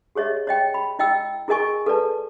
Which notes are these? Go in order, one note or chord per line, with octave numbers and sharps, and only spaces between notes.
G4 G#4 C#5 D#5 E5
C#5 D#5 G5
B5
E4 D#5 G5 E6
E4 G#4 A#4 D#5 G#5 C#6
A4 B4 D5 A5